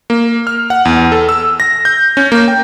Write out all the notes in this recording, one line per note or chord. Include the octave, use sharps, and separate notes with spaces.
A#3
F6
F#5
E2
A4
E6
A#6
G6
C#4
A#3
G5